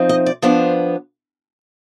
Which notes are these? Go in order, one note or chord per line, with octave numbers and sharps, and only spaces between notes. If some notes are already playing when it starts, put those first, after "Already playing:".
Already playing: F3 C4 D#4
D#5
D5
F3 B3 D4 C5